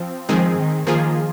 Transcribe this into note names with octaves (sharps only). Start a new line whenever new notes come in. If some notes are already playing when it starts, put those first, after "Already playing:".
Already playing: F3 C4
D#3 F3 G#3 C4 G#4
D#3
D#3 F3 A#3 F4 G#4